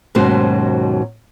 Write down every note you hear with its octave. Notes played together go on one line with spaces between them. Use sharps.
D#2 G#2 B2 F#3 C#4 C5